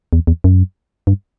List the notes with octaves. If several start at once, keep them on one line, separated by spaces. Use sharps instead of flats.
E2
E2
F#2
G2